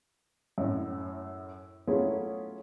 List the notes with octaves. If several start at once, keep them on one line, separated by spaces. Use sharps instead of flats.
F#2 A2
F#3 A3 C#4 E4 F4 G#4